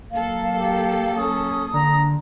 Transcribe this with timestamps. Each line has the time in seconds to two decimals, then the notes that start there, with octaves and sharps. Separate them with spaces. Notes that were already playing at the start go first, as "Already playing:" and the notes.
0.12 F#3 A#3 A4 F5
0.57 G4
1.17 C#4 D#6
1.74 D3 A#5